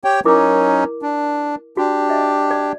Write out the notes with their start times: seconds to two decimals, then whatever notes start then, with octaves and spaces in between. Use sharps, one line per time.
0.04 G4 C#5 G5
0.25 F#3 C#4 D#4 E4 A#4 D6
1.02 D4
1.77 D4 F#4 G4
2.10 D#5 E5
2.51 D5